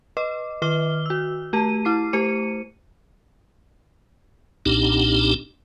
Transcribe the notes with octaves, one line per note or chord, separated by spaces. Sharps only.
B4 D#5 D6
D#3 B4 D6 F6 G7
F#4 E6
A3 G4 A5 D#7
E4 D6 C7
A3 G4 C5 C#7 D#7
B1 A#2 C4 D4 D#4 G4